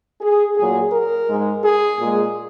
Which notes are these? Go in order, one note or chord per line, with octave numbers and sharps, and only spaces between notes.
G#4
A#2 F#3 G#4
A#4
G#2 G#3
G#4
A#2 G#3